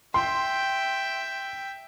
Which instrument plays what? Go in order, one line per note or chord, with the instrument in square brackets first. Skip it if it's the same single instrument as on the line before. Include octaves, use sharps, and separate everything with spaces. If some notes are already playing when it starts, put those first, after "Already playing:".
[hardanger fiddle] E5 G5 [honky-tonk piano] C6